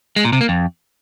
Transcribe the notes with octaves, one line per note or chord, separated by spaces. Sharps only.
G#3
A#2
C3
A#3
F2